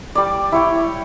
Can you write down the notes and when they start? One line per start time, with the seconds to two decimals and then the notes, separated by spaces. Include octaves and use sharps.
0.15 G3 D5
0.52 E4 C#5 G5